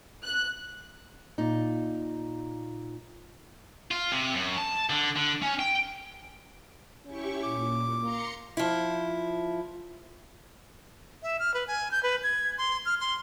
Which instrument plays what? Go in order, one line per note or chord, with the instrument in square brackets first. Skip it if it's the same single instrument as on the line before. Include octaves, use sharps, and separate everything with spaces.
[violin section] F#6
[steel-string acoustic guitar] A#2 D#4
[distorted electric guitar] F4
C3
F#2
A5
D3
D3
C#4
G5
[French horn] C#4 [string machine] E4 G4 C#6
[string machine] A#2 [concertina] D6
[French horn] A#3 [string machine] A#5 C6 C#7
[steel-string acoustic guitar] F3 E4
[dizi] E5
F6
B4
G#5
G6
B4
G#6
C6
F6
C6